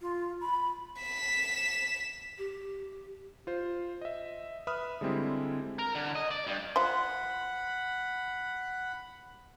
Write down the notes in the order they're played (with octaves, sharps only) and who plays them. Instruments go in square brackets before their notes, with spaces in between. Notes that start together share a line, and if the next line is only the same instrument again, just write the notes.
[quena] F4
B5
[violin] B6 E7
[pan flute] G4
[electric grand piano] F4 C5
D#5 E5
B4 E5 B5 D#6 F6
D3 G3 G#3 C4 E4
[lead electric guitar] A#4
D3
D#5
D5
G2
[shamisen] F4 C5 [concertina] F#5 B5